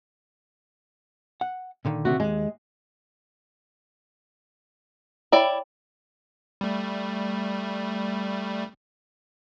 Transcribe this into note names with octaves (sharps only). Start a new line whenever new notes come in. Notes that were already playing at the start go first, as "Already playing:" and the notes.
F#5
A#2 D3 D#3
C3 F#4
D#2 G#3
E4 C#5 D5 G5 B5
G3 A3